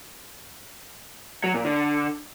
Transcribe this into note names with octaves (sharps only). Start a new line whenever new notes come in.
F#3
A#2
D3